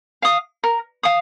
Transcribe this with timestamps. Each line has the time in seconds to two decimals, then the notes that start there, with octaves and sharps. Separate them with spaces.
0.22 F5 D#6
0.64 A#4
1.03 F5 D#6